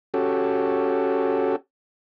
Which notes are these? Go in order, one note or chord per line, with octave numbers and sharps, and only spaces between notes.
C#4 F#4 G4 A4